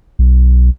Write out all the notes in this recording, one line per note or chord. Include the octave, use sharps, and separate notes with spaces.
B1